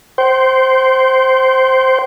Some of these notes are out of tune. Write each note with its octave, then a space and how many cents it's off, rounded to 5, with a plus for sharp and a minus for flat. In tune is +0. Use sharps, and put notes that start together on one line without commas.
C5 +0 G5 -35